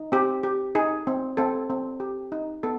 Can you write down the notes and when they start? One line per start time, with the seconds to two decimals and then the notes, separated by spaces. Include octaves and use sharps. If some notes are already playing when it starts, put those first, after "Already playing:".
Already playing: D#4
0.12 C4 G4
0.43 G4
0.75 D#4 G#4
1.07 C4
1.37 C4 A4
1.70 C4
2.00 G4
2.32 D#4
2.63 B3 A4